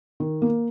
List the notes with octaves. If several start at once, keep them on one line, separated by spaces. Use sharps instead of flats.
D#3
A#3